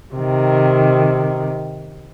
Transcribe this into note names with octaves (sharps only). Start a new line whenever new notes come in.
C3 D#3